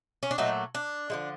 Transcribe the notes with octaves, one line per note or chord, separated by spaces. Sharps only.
C#4
D4
A#2 F#3 A3 D#4
D4
D3 F3 G#3